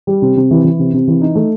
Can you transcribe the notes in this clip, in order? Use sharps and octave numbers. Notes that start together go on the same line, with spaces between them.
G3
C3
C3
E3
E3
C3
C3
E3
D#4
A3